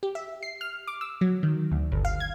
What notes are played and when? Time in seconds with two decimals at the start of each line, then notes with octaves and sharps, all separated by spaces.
0.03 G4
0.15 E5
0.43 C7
0.61 F6
0.87 D6
1.01 E6
1.21 F#3
1.43 D#3
1.72 D2
1.92 G1
2.05 F5
2.20 G#6